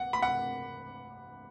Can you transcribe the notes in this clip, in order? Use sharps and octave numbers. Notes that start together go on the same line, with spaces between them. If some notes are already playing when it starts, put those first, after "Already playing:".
Already playing: F#5
B5
F#5